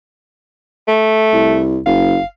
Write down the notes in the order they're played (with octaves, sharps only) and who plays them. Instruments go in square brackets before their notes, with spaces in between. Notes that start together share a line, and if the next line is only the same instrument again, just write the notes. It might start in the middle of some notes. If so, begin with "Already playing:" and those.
[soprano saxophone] A3
[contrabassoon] C2
[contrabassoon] F#1 [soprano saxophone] F5